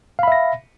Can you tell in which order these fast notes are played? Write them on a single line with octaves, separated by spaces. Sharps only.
F5 B5 E5 A#6